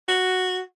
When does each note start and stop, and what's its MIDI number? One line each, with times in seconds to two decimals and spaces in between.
0.08 0.61 66